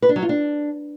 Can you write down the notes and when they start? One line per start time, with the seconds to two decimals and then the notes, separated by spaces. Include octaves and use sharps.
0.02 B4
0.09 D4
0.16 F#3
0.23 F4
0.29 D4